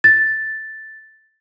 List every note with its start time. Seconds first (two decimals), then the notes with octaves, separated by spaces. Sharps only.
0.04 A6